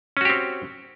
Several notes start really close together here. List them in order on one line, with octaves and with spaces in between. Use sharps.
C#4 F#4 G4 C4